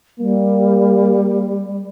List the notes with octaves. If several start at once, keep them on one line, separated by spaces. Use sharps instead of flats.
G3 A#3